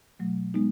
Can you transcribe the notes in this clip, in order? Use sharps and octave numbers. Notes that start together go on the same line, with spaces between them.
B2 F#3 A3
G#3 B3 D#4